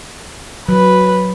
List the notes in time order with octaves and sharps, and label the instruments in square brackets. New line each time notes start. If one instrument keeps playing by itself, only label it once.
[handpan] F#3 [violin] B4